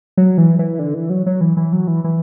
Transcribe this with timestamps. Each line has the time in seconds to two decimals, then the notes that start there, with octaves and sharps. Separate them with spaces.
0.17 F#3
0.38 E3
0.59 E3
0.79 D3
0.94 E3
1.10 F#3
1.26 F#3
1.41 E3
1.57 E3
1.73 F#3
1.88 E3
2.04 E3